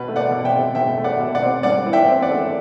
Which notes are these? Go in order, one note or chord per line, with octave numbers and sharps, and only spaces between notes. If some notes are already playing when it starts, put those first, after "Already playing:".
Already playing: B2 B4
A3
D5 F#5
B2
E5 G5
C4
B2 E5 G5
A3
D5 F#5
B2
D5 F#5
C4
G2 D5 F#5
E3
E5 G5
C4
D5 F#5
A3